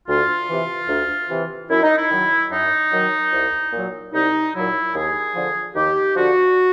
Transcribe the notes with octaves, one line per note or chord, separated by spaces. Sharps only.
D2 F4
C3 E3
D2
C3 E3
F#2 E4
D#4
E4
D#3 F#3
F#2 D#4
D#3 F#3
C2
A#2 F#3
C2 D#4
A#2 F#3 E4
D#2 G#4
D3 F3
D#2 G4
D3 F3 F#4